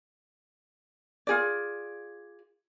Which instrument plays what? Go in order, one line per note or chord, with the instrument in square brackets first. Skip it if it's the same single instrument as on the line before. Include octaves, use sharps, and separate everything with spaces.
[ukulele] F4 G#4 D5